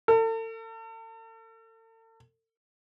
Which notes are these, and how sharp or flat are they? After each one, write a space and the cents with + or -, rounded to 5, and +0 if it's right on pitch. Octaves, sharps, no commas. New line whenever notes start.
A4 +40